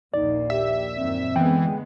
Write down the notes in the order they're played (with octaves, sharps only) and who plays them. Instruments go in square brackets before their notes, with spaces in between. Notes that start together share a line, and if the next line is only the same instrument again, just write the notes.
[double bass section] A#1 D#2 A#3 [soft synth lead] D#4 [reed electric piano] D5
[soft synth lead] G4 [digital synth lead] E5
[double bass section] F#2 A#2 D#3 [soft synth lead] C4
[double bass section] D3 G#3 B3 [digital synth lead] E3 [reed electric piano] G5